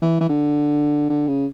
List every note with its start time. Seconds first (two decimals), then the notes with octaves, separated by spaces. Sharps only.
0.02 E3
0.21 E3
0.29 D3
1.10 D3
1.27 C#3